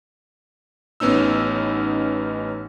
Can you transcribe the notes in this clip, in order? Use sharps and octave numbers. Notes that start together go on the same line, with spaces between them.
A1 B3 C#4 D#4 E6